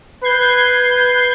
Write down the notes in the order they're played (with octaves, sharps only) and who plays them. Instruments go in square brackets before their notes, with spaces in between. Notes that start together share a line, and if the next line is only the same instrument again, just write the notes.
[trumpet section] B4 [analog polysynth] G6 G#6 C7